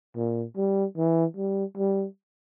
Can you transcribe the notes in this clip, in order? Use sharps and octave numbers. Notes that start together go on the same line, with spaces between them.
A#2
G3
E3
G3
G3